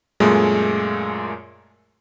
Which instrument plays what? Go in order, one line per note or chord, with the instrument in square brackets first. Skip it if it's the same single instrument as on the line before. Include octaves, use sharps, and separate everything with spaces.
[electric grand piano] F#2 A#2 G#3 A3